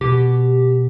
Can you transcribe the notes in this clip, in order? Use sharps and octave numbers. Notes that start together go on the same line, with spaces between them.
B2 G4